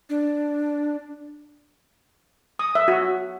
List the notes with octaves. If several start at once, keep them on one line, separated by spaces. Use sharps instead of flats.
D4
D#6
E5
F#4